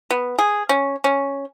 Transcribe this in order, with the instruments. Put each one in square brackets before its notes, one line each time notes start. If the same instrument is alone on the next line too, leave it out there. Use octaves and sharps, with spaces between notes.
[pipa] B3
G#4
C#4
C#4